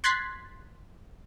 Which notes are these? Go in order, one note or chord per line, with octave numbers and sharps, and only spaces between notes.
C6 F#6 G#6 A6 B6 C7